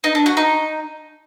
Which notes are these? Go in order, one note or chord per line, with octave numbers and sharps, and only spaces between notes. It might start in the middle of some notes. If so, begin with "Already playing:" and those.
D#4
D4
F#4
D#4